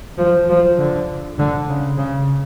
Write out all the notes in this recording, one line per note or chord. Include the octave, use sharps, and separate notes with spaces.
F3
F3
D3
D3
C#3
C#3